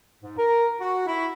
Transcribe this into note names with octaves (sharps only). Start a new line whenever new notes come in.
G#2
A#4
F#4
E4